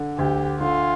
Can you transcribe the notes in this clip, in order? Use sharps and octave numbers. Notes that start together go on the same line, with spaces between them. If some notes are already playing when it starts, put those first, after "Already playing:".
Already playing: D3
D2 G4
D3 F4